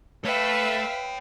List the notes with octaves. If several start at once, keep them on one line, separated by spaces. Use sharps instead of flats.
A3 B4 C#5 E5 F5 G5